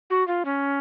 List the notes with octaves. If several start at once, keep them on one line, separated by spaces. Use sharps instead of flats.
F#4
F4
C#4